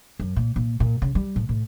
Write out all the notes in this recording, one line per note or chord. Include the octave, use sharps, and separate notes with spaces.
F#2
A#2
A#2
A#2
C#3
G3
A2
A2